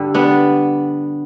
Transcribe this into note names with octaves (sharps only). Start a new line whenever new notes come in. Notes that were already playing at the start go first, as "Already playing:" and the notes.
Already playing: G2 D3 G3
B3 D4